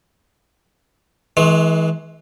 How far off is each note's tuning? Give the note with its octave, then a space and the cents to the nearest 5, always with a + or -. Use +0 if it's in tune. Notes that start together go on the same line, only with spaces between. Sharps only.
E3 -30 G#3 +25 C6 +30